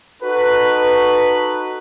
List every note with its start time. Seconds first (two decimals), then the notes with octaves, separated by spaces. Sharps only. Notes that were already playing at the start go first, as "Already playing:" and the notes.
0.22 D#4 F#4 A4 B4